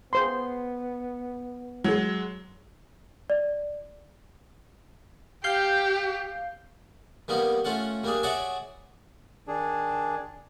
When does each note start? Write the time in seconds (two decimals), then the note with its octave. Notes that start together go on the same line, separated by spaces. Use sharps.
0.13 B3 G#4 C5 C6
1.84 F#3 G#3
3.30 D5
5.44 G4 F5 G6 C7
7.28 D#3 G3 A#3 B3
7.65 A3 C#4 F4 F#5
8.04 G3 A#3 D4 G#4
8.23 F#4 G#4 C#5 D5 E5 F#5
9.48 D#3 D4 G#4